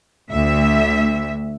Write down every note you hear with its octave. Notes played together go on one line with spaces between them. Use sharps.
D2 E5